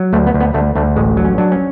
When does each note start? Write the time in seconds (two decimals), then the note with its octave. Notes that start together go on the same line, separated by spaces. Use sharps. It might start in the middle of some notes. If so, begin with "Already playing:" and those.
Already playing: F#3
0.13 D2 A3
0.26 B3
0.34 D2
0.40 B3
0.54 D2 A3
0.75 D2 A3
0.96 A1 G#3
1.17 F#3
1.25 C#4
1.38 F#3 D4
1.52 C#4